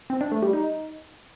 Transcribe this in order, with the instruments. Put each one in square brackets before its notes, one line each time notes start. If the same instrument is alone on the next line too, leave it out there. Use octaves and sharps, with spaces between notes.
[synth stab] C4
D4
A3
G3
D#4